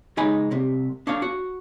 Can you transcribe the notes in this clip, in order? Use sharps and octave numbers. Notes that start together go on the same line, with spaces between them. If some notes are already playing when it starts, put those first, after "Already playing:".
C#2 G#3 D#4 G#5 B5
C2 C3
D4 C#5 F5
F#4